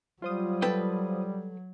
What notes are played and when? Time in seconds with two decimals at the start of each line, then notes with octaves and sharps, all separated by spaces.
0.22 F#3 G3 F4 C5 D#6
0.62 A4 B4 G5